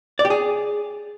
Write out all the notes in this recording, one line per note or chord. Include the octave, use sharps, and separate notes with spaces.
D5
G4
G#4